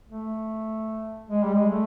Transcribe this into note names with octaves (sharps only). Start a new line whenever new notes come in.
A3
G#3
G3
G#3
A3